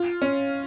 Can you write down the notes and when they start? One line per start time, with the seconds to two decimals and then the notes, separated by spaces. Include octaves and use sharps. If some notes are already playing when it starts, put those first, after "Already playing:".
Already playing: F4
0.22 C#4